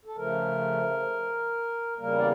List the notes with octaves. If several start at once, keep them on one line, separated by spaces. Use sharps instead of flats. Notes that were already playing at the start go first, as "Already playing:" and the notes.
A4
C#3 F3 A3 A#4
E2 C#3 G3 A#3 A#4
D5